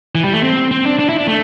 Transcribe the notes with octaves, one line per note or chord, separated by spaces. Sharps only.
E3
G3
A3
C4
C4
D4
D4
E4
D4
A3